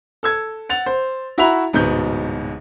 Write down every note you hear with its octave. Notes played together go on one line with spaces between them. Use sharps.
A4 E6 G#6
F#5 A6 F7
C5
E4 F#4 E5 A#5 B5 F7
D1 G#2 B2 G6